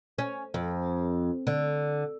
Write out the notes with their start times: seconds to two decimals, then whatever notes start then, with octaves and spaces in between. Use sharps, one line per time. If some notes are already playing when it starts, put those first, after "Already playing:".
0.18 C#4
0.54 F2
1.47 D3